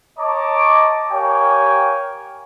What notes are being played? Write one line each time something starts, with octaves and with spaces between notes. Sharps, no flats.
C#5 D#5 A5 A#5 D6
G4 A#4 C#5 F5 G5 G#5